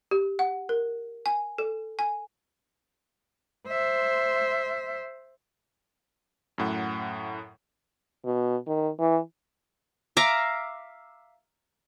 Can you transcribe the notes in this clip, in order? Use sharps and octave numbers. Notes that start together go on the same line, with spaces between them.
G4
F#5
A#4
G#5
A4
G#5
C5 E5
F#2 A2 F#5
B2
D#3
E3
E5 F5 A#5 D6